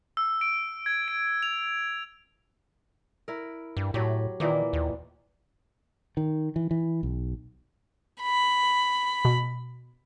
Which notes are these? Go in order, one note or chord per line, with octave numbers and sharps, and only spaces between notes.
E6
D7
G#6
D7
F7
E4 A#4
G2
A2 F#3 G4
A#2 D#3 E3 A#3
D#2
D#3
E3
E3
B1
B5
B2